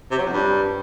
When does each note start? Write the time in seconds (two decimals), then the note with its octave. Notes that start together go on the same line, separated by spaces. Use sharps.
0.11 C3
0.18 F#3
0.26 F2
0.33 G2